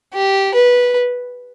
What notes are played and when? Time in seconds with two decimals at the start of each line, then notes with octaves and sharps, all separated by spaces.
0.14 G4
0.54 B4